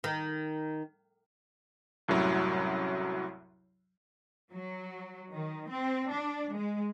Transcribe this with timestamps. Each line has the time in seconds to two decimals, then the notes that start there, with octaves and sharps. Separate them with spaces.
0.04 D#3
2.08 C2 F#2 A2 F#3 E4 C#5
4.54 F#3
5.32 D#3
5.70 C4
6.11 D4
6.55 G#3